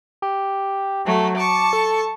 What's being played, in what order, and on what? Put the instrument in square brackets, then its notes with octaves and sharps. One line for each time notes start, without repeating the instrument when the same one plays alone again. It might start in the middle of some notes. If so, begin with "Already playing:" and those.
[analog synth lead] G4
[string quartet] F#3 A3
[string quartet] A5 C#6 [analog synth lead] D6
[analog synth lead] A4